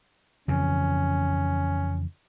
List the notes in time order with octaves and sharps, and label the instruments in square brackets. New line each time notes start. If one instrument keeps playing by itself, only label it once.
[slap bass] F2 C#3 E3 [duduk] C#4